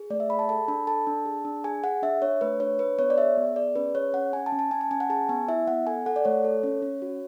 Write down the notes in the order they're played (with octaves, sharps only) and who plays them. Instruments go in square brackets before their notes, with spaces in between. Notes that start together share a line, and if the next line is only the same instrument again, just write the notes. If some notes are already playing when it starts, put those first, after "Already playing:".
Already playing: [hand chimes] G#4
A3 D5
E5
G#4 B5
A5
A4 A5
D4 B5
A4 A5
D4
G#4
D4
G#4 G#5
G#4 F#5
D4 E5
D4 C#5
A3 B4
D4 C#5
D4 B4
B3 C#5
D5
G#4 E5
B3
G#4 D5
C#4 B4
G#4 C#5
C#4 F#5
C#4 G#5
A5
C#4
A5
C#4 G#5
A5
C#4 G#5
F#5
G#4 A5
B3 G#5
E4 E5
B3 F#5
A4 G#5
A4 F#5
D5
A3 C#5
A4
C#4
C#4
F#4